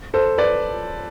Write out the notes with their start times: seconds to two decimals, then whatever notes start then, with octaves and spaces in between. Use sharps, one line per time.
0.14 A4 C5
0.38 B4 D5